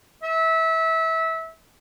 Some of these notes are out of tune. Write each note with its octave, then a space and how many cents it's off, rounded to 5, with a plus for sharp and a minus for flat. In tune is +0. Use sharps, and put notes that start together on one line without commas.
E5 -25